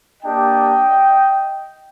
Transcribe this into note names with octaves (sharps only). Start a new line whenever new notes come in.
A#3 D4 G4 D#5 G5